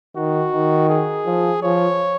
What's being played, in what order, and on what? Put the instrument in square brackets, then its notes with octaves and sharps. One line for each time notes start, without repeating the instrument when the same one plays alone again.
[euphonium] D#3 [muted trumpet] F#4
[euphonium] D#3
[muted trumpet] G#4
[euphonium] F3
[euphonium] F3 [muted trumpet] C#5